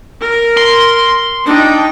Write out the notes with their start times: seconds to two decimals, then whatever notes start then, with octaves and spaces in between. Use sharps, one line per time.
0.21 A#4
0.57 C6
1.46 D4 D#4 G5